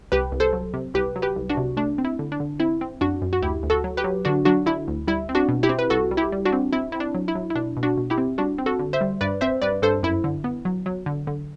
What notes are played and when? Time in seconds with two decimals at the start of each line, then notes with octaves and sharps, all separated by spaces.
0.12 C2 G4 B4
0.32 C2
0.40 A4 C5
0.53 F#3
0.74 C3
0.94 C2 G4 B4
1.16 F#3
1.22 G4 B4
1.36 C2
1.50 D4 F#4
1.57 C3
1.77 A3 D4
1.98 C4
2.05 E4
2.19 D3
2.32 D4
2.40 D3
2.60 C4 E4
2.81 C4
3.01 F#2 D4 F#4
3.22 F#2
3.33 F#4
3.42 D2 E4 G4
3.63 D2
3.70 F#4 A4
3.84 F#3
3.97 G4 B4
4.04 F#3
4.25 D3 D4 F#4
4.45 F#3 D4 F#4
4.66 D3 E4
4.88 D2
5.07 G3 E4
5.29 C4
5.35 D4 F#4
5.49 B2
5.63 E4 G4
5.69 C4
5.79 B4
5.90 C2 F#4 A4
6.11 G3
6.17 E4 G4
6.32 G3
6.45 D4 F#4
6.52 C4
6.73 C4 E4
6.92 C4 E4
7.00 D4
7.15 F#3
7.28 E4
7.35 F#3
7.50 E4
7.55 B2 D4
7.77 B2
7.83 D4 F#4
7.98 B2
8.10 E4 G4
8.18 C4
8.38 G3 D4 F#4
8.58 C4
8.66 F#4 A4
8.79 D3
8.93 C5 E5
9.01 G3
9.21 G2 B4 D5
9.41 C4 C5 E5
9.62 G2 B4 D5
9.82 G2 A4 C5
10.03 F#2 E4
10.24 D3
10.44 B3
10.65 F#3
10.86 F#3
11.06 D3
11.27 D3